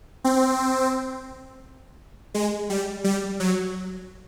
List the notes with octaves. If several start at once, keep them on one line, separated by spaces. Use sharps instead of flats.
C4
G#3
G3
G3
F#3